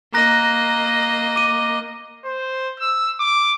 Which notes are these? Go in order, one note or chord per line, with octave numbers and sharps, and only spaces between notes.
A#3 D#5 A#5 F#6 A#6
D6 D#7
C5
E6
D6